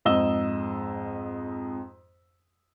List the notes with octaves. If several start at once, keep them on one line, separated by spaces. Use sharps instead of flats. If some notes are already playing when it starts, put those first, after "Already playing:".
F2 G#2 D#5 E6 E7 G7